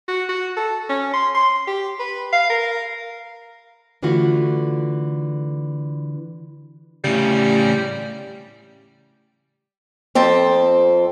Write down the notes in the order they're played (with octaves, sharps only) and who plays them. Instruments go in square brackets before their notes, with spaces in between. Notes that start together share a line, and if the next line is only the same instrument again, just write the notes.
[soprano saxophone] F#4
F#4
A4
C#4
C6
C6
G4
B4
F5
A#4
[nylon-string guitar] D3 E3 A3 F4 F#4
[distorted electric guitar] A2 C#3 [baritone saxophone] G3
[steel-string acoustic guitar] F2 C4 A4 A5